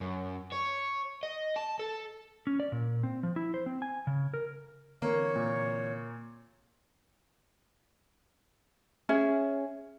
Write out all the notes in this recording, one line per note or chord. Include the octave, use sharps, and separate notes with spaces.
F#2
C#5
D#5
A5
A4
C#4
D5
A#2
C4
F3
E4
C5
C4
G#5
C#3
A#4
D3 E3 A#3 C4 C#5
A#2
C#4 G#4 E5